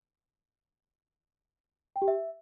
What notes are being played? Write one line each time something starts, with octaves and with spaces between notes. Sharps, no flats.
G5
G4
E5